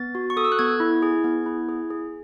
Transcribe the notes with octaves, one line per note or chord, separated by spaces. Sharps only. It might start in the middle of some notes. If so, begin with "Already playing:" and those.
Already playing: B3 A6
F#4
C#6
A4 D#6
E6
F#6
B3 G#6
E4
G#4
B3
E4
G#4
G#4